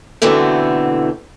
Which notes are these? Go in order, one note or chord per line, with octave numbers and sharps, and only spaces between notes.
F#2 B2 D3 E3 A3 C4